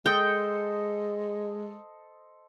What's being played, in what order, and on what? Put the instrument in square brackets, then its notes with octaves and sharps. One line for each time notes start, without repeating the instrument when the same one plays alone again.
[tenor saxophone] G#3 [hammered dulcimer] A4 C5 D#5 [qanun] G5